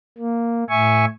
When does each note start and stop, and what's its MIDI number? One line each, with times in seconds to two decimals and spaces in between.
0.18 0.64 58
0.70 1.05 45
0.70 1.05 76
0.70 1.05 80
0.70 1.05 85